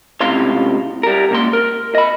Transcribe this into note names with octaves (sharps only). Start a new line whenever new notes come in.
C#2 A2 C3 F5 C6
G3 A#4
C#2 A#3 C6
A#4
D#5 B5